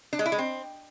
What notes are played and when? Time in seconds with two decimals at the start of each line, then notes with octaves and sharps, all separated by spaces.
0.13 D4
0.19 G#3
0.26 E4
0.32 G#3
0.39 C4